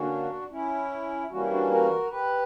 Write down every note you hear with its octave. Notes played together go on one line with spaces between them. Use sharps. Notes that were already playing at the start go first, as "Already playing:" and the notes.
Already playing: D3 A#3 C#4 D4 F#4
C#4 E4
E3 G3 A#3 C#4 F#4
E4
D4 F#4
F#4 A#4
G4 B4